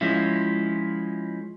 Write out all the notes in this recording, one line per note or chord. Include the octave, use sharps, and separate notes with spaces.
F3 G#3 C#4 E4